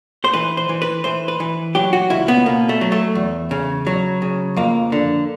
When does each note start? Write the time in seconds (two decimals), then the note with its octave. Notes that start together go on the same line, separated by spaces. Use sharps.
0.24 C5
0.33 E3 B4
0.57 C5
0.69 E3
0.82 B4
1.04 E3 C5
1.28 B4
1.40 E3
1.75 F#3 G4
1.93 F#4
2.10 C#2 E4
2.28 B3
2.46 B2 A#3
2.69 A3
2.81 F#3
2.92 A3
3.15 E2
3.51 C#3
3.87 F#3
4.22 C#3
4.57 F2 A#3
4.92 D3